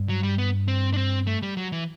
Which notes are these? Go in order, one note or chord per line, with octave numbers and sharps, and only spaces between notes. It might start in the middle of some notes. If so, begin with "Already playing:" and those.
Already playing: G2
F#3
G3
B3
C4
D4
C4
A3
G3
F#3
E3